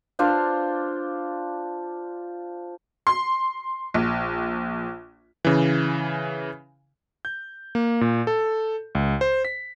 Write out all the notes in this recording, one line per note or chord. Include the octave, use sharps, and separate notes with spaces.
D4 F4 C5 F5
C6
A#1
C#3 E3
G6
A#3
A#2
A4
C#2
C5
B6